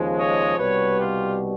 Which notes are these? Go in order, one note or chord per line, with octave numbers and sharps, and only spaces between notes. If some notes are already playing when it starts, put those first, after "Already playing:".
Already playing: D#2 C#3 F3 G#3
C#5 D#5
C2 B2 G3 B4 C#5
F4 G4